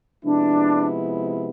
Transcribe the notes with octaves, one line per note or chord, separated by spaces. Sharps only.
C3 F3 G#3 B3 D4 E4